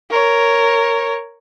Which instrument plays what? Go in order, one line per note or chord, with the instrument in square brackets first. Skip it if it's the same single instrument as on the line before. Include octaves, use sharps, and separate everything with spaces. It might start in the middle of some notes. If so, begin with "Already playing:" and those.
[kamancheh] A#4 C#5